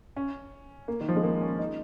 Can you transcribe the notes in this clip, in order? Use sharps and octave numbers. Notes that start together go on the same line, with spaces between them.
C#4
A#3
D#3
F3
G#3
A#3
C#4
D#4